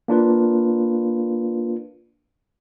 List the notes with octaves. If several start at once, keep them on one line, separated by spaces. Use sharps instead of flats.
A#3 D4 F4 B4